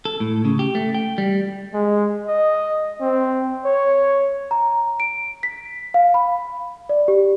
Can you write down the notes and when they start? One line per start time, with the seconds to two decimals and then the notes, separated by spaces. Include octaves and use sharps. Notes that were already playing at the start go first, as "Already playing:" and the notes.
0.05 A4
0.20 A2
0.45 C#3
0.59 G4
0.75 A3
0.95 G5
1.18 G3
1.74 G#3
2.27 D#5
3.01 C4
3.65 C#5
4.51 A#5
5.00 D7
5.43 B6
5.94 F5
6.14 B5
6.89 D5
7.08 G4